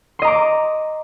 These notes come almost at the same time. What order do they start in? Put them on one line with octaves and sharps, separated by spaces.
C6 D#5 A#5 D6